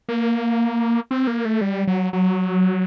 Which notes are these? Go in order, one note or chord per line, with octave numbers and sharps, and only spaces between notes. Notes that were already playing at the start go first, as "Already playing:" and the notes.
A#3
C4
A#3
A3
G3
F#3
F#3